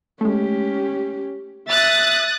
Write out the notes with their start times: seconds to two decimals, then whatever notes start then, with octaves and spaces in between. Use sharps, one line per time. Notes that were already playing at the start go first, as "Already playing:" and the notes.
0.21 G#3 A3 C#4 G4
1.69 E5 D#6 F#6 A6